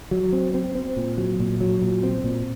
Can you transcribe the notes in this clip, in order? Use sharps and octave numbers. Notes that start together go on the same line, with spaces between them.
F#3
C4
C4
C4
A#2
F#3
A#2
F#3
A#2
C4
A#2